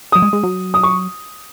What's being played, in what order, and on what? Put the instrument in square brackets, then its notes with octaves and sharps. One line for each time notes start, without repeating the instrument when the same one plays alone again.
[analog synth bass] F#3 [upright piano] D#6
[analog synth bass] G#3
G#3
F#3
[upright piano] D#6
C#6